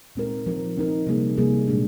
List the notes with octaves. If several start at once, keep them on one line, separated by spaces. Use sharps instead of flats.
A#2 G#3 C4 D#4 A#4
F3 C4 D#4 A#4
F3 C4 D#4 A#4
C3 G3 A#3 D#4 G#4
C3 G3 A#3 D#4 G#4
A#2 G#3 D4